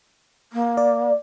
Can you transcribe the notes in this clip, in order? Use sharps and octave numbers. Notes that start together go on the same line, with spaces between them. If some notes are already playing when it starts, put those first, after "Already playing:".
A#3
D5